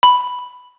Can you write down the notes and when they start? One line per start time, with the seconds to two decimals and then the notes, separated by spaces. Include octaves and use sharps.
0.03 B5